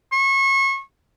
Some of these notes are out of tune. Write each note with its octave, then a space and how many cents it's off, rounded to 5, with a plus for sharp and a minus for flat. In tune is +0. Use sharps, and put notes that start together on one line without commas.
C#6 -30